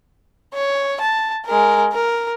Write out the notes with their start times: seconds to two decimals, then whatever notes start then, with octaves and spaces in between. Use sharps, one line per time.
0.54 C#5
1.01 A5
1.46 G#3 A#4
1.93 A#4